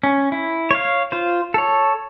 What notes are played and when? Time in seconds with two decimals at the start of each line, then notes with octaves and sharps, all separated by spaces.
0.03 C#4
0.32 E4
0.71 C#5 F5
1.12 F4 C5
1.54 A4 C#5